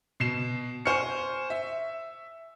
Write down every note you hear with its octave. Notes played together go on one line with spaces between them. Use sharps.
B2 C7 E7
C5 G#5 C#6 F6 C#7
E5